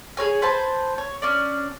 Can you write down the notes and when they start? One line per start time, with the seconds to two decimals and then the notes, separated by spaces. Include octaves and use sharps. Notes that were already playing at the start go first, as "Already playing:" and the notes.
0.17 G#4 B4 C#5 G#5
0.42 B4 C5 G#5 A5
0.98 C#5
1.22 C#4 D4 D5